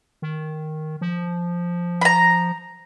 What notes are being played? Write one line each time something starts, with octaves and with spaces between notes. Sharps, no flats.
D#3
F3
A#5 B5